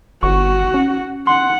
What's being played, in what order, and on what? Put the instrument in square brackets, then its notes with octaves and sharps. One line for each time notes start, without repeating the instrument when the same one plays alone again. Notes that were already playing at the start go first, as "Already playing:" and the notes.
[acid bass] G1 [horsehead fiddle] F#4 [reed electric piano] C#6
[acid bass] C#4
[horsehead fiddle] F#5 [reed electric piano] C6